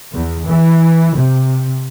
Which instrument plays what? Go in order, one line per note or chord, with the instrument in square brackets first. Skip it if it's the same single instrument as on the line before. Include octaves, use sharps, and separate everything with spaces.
[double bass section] E2
E3
C3